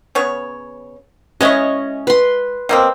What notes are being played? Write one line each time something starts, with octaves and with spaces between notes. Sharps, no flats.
C#3 B3 C#5
G#3 C#4 E4 C#5 D#5
B4 C6
B2 A#3 C4